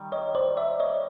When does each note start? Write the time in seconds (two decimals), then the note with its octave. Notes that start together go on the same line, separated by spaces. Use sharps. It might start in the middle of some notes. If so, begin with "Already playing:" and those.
Already playing: D#3 G3
0.12 C#5 D#5
0.35 C5 D5
0.57 D5 E5
0.80 C#5 D#5